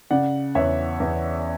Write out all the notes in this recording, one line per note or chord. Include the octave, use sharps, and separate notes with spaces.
C#3 D5 F#5
E2 C#5 E5
E2